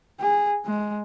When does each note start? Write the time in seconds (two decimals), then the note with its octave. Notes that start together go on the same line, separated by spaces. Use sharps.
0.20 G#4
0.65 G#3